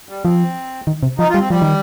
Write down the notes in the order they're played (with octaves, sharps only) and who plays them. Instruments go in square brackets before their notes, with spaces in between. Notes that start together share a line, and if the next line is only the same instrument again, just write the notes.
[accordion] G3
[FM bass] F3 [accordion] C4
[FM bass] D#3
C3
[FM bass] F3 [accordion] D#4
[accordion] F4
[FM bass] G3
[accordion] C4
[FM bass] F3 [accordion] G3
[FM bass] D#3